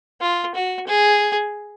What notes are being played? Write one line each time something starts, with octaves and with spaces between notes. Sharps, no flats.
F4
F#4
G#4